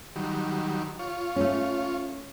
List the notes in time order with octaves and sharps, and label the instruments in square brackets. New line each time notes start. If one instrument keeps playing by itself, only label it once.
[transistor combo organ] D#3 F#3 G3
F4 C#5
[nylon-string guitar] A3 C#4